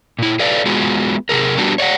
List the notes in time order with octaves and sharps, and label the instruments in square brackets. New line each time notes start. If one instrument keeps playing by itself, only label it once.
[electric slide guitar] A#2 E4
A4 B4 D5 F5
G#3 B3 F4 F#4 G#4
C3 G#3 G#4 A#4
G3 B3 D4 F#4 G4
C#5 D5 E5 F#5